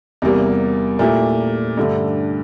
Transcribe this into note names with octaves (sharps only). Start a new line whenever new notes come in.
E2 C3 G3 A#3
A#2 A3 E4 G4
G2 D3 A3